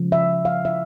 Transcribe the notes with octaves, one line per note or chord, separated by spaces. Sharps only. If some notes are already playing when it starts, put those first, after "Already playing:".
Already playing: C#3 F3 G#3
E5
F5
E5